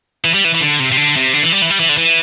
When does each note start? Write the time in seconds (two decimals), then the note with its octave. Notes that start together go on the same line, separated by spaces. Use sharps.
0.25 E3
0.34 G3
0.44 E3
0.55 E3
0.61 D3
0.80 C3
0.92 C3
0.97 D3
1.16 C3
1.33 D3
1.43 E3
1.52 G3
1.62 E3
1.70 G3
1.80 E3
1.89 D3
1.97 E3